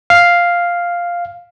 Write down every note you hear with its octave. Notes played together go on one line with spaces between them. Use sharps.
F5